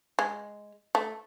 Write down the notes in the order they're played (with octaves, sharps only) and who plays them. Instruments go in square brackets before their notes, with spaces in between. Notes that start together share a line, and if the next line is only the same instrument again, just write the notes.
[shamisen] G#3
A3